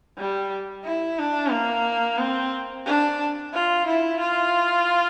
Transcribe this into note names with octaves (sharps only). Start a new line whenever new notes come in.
G3
E4
D4
A#3
C4
D4
F4
E4
F4